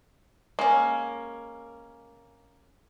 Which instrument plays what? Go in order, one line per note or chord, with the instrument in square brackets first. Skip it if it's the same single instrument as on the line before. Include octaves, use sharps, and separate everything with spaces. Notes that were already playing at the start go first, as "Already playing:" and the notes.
[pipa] G#3 C#4 [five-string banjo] A#3